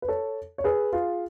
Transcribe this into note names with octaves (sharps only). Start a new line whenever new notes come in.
B4
A4 C#5
C#5
G#4 B4
F4 G#4